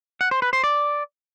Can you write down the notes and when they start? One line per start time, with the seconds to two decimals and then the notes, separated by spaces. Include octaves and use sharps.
0.21 F#5
0.31 C5
0.42 B4
0.53 C5
0.64 D5